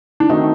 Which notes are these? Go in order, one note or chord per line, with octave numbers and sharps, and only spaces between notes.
D4
D#3 F#3 A3 C4 D#4 F#4